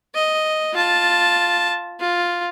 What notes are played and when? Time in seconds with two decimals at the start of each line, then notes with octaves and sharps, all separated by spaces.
0.15 D#5
0.74 F4 A5
2.00 F4